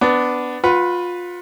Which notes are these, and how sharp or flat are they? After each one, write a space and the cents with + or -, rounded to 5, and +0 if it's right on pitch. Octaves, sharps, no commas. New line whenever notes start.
B3 +15 D4 +0
F4 +25 B4 +0 F#5 +0